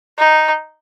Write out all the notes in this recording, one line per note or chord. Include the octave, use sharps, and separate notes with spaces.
D#4